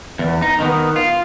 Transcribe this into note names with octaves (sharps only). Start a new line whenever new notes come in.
E2
D#4
D#3 B3
F4